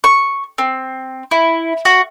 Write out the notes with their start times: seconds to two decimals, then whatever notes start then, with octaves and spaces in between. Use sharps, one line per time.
0.04 C#6
0.58 C4
1.31 E4
1.85 F#4